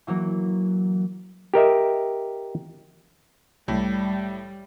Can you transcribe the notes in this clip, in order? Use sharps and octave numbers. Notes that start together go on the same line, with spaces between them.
E3 F#3 A#3
G4 A#4 D#5 E5
C2 A2 G3